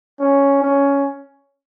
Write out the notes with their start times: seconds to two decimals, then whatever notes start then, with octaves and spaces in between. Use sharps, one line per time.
0.20 C#4
0.62 C#4